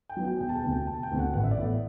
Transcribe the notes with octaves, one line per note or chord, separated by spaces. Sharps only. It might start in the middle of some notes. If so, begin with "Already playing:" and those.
G5
F#3 B3
G5
E1 G5
A5
G5
D2 C3
G5
E1 A5
G5
D2 C3
F#5
A1 F#5
E5
D5
A2 E3 B3 E5